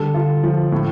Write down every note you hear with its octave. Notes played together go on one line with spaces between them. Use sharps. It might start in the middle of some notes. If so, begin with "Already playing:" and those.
Already playing: D3 G3 A4
F4
F3
A2